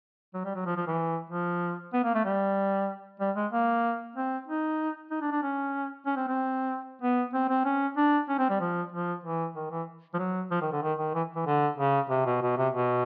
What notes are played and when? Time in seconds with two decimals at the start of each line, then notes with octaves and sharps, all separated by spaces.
0.34 F#3
0.45 G3
0.55 F#3
0.66 F3
0.77 F3
0.87 E3
1.30 F3
1.93 B3
2.04 A#3
2.14 A3
2.25 G3
3.20 G3
3.36 G#3
3.52 A#3
4.16 C4
4.47 D#4
5.11 D#4
5.21 D4
5.32 D4
5.43 C#4
6.06 C#4
6.17 C4
6.28 C4
7.02 B3
7.33 C4
7.49 C4
7.65 C#4
7.97 D4
8.29 C#4
8.39 C4
8.50 G3
8.60 F3
8.92 F3
9.24 E3
9.56 D#3
9.71 E3
10.14 F3
10.19 F#3
10.51 F3
10.61 D#3
10.72 D3
10.82 D#3
10.99 D#3
11.15 E3
11.36 E3
11.47 D3
11.78 C#3
12.10 C3
12.26 B2
12.42 B2
12.57 C3
12.74 B2